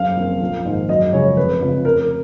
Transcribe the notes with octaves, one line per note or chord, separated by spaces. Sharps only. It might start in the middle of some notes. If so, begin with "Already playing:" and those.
Already playing: F#1 F5
F2 F3 A#3 C#4
A#1
G#2 D#3 A#3
F#2 D#5
C#3 F3 G#3 C#4 C#5
F1 B4
F2 C#3
F1 A#4